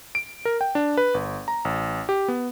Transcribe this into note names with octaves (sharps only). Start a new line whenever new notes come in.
D7
A#4
G5
D4
B4
G1
A#5
A1
G4
B3